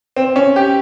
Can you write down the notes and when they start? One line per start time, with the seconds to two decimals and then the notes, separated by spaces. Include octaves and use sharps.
0.16 C4
0.36 C#4
0.56 G4